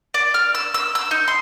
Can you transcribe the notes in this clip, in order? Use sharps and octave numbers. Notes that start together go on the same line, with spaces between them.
D5
F6
E6
E6
E6
D#4
C6